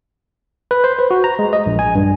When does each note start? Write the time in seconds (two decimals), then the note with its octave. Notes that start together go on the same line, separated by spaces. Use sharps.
0.71 B4
0.84 C5
0.99 B4
1.11 F#4
1.24 A#5
1.39 G#3
1.53 D#5
1.66 A#1
1.79 G#5
1.95 G2